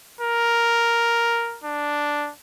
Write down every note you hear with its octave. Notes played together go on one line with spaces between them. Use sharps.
A#4
D4